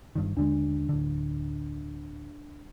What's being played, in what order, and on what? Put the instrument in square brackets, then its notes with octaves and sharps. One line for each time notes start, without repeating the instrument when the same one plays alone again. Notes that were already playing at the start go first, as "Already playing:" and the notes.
[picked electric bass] G1 G2 D#3
[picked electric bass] D#2 D3 G#3 [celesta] D4
[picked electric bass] D1 D3